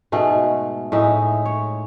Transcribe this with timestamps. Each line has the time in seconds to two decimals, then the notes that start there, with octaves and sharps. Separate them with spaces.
0.12 G#2 B2 A3 G#4
0.92 A2 G#3 D#4 E5
1.45 C#5